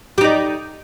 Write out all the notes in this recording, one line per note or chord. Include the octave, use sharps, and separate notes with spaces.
D#4 G4 D5